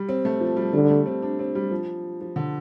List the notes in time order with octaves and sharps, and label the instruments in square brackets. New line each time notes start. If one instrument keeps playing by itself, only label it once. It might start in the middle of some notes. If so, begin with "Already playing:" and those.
Already playing: [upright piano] G3
C4
A3
F3
G3
[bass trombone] D3 [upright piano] G3
[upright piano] A3
C4
D4
C4
G3
F3
F3
D3